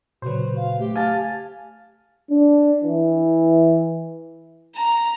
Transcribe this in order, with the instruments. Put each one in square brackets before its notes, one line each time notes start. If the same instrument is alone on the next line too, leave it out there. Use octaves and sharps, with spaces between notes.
[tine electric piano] A#2 C#3 B4 [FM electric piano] F#3 C5 [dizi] F#4
[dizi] F5
[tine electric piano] A3 [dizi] G4
[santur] F5 A5 [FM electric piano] G#5
[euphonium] D4
E3
[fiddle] A#5